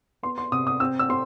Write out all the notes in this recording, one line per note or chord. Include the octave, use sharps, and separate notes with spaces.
B3 C6
C6
C3 D#6
D#6
C4 E6
E6
C4 C6